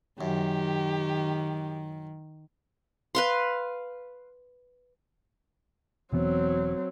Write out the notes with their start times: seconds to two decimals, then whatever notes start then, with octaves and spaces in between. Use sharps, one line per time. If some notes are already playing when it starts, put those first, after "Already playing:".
0.21 F#2 D#3 G4
3.15 B4 F5 C6
6.13 E1 E3 F#3 B3 C4